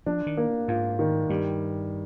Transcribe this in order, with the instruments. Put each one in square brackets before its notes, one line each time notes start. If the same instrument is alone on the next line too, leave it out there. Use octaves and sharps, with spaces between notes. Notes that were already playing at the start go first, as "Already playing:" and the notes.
[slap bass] F3 [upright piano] D4
[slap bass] D#3
[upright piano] A#3
[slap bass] G#2 [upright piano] F4
[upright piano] D#3
[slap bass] G2 [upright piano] G3